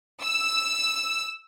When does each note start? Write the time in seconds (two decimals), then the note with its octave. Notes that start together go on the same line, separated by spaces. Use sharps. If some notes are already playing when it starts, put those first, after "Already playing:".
0.23 E6